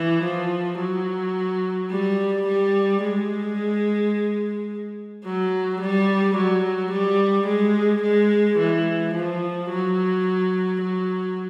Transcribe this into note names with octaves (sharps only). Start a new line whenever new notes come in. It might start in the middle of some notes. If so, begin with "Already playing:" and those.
Already playing: E3
F3
F#3
G3
G3
G#3
F#3
G3
F#3
G3
G#3
G#3
E3
F3
F#3
F#3